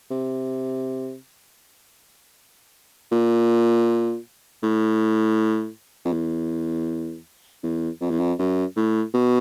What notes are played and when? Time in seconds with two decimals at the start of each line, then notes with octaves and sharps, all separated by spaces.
0.11 C3
3.12 A#2
4.63 A2
6.05 F2
6.13 E2
7.63 E2
8.01 F2
8.10 E2
8.20 F2
8.39 F#2
8.77 A2
9.14 B2